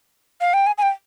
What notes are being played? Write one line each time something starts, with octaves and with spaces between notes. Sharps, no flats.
F5
G5
G#5
G#5
G5